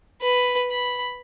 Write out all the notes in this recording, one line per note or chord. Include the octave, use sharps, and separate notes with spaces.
B4
B5